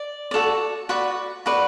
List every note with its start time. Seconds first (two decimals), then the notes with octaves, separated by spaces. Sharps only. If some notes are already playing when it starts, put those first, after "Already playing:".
Already playing: D5
0.31 F#4 A4 D5
0.89 F#4 B4 D5
1.46 F#4 B4 D5